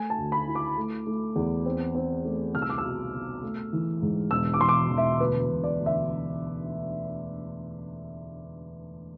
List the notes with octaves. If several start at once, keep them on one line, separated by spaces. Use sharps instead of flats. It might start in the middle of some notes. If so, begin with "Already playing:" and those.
Already playing: A3 G#5
A5
D2
B5
E4
D6
A3
A3
E2
C4
C4
A3
C2 F6
E6
D6
E6
B2
B2
A3
E3
G#2
E1 E6
D6
E1 C6
D6
E1
E5
D2 B4
E1
D5
D2
E5